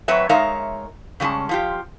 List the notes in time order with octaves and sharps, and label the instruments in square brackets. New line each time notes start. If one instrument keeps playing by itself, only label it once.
[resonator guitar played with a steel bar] F#3 C4 B4 C#5 E5
G#3 D#4 A#4 C#5 E5 F5
C#3 G3 G#3 C#4 A5
F3 F4 G4